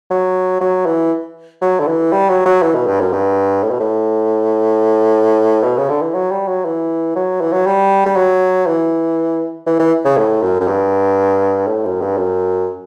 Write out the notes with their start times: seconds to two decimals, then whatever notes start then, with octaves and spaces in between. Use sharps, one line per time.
0.11 F#3
0.61 F#3
0.86 E3
1.62 F#3
1.80 D3
1.87 E3
2.12 G3
2.29 F#3
2.46 F#3
2.62 E3
2.75 B2
2.87 G2
3.00 F#2
3.13 G2
3.63 A2
3.71 B2
3.80 A2
5.64 B2
5.78 C#3
5.89 D3
6.02 E3
6.15 F#3
6.31 G3
6.48 F#3
6.65 E3
7.16 F#3
7.41 E3
7.53 F#3
7.66 G3
8.06 G3
8.16 F#3
8.67 E3
9.67 E3
9.79 E3
10.05 C#3
10.17 A2
10.42 F#2
10.61 F#2
10.68 G2
11.67 A2
11.85 F#2
12.02 G2
12.18 F#2